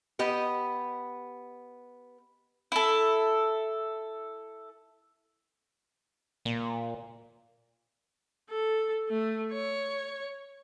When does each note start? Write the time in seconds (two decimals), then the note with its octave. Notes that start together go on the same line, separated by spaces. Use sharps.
0.19 B3 G4 D#5
2.72 E4 A4
6.45 A#2
8.50 A4
9.09 A3
9.52 C#5